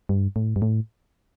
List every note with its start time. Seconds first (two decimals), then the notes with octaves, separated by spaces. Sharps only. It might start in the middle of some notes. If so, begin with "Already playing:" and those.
0.09 G2
0.36 A2
0.56 G2
0.62 A2